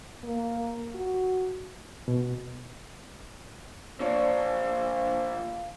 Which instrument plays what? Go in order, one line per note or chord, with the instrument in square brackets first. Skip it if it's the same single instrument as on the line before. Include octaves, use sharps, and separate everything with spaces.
[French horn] A#3
F#4
[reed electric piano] B2
[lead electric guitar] A#2 F3 [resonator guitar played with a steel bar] D4 C#5 [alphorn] C5 [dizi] F5